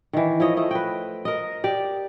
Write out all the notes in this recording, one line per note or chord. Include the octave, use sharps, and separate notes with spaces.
D#3 E3
F3 E4 C#5 D#5
A3 D#5
B4 G5
A#4 D#5
G4 D5